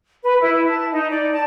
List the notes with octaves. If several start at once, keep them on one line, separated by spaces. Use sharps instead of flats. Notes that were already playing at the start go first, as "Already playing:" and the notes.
B4
E4
A5
D#4
D5
A5